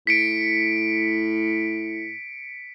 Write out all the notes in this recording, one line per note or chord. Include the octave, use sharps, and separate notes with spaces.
A2 B6 C#7 D7